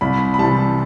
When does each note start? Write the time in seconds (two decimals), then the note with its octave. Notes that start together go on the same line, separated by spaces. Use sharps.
0.01 C2 B5
0.34 B5
0.38 C3 E3 G3 A5